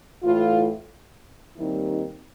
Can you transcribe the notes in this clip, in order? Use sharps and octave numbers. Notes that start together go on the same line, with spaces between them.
A2 E3 A3 F4
D#2 D#3 G3 C4 D#4 E4
D#4